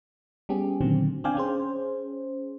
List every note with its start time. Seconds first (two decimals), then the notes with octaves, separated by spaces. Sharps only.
0.49 G3 B3 C#4 G4 G#4
0.81 A#2 D3 D#3 F#3 C4
1.24 C4 D4 D5 F5 G5 G#5
1.37 C#4 G#4 C5